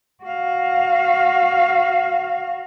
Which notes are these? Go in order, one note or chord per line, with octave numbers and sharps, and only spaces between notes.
F#4 F5